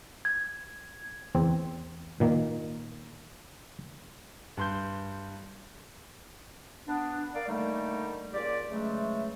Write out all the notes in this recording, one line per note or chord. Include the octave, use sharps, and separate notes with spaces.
G#6
E2 C4
A#2 D#3 A#3
G2 C6 G6
B3 D4
A#4 D5 F5
D3 D#3 G3 A3 A#3 D#4
C#2 A#2 G4 D5
C#3 E3 F#3 G#3 A3